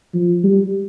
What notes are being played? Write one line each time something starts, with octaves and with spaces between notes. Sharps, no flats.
F3
G3